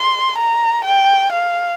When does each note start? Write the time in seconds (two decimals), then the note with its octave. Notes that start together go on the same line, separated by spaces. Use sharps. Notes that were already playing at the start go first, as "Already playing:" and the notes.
Already playing: C6
0.38 A#5
0.85 G5
1.32 F5